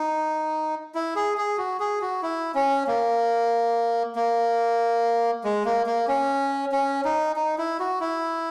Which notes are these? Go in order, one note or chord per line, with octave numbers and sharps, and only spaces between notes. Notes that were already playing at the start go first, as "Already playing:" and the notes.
Already playing: D#4
E4
G#4
G#4
F#4
G#4
F#4
E4
C#4
A#3
A#3
G#3
A#3
A#3
C#4
C#4
D#4
D#4
E4
F#4
E4